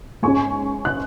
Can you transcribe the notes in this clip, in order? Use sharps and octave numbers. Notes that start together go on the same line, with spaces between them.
G#2 G#3 C#4 G#5 C#6
F#6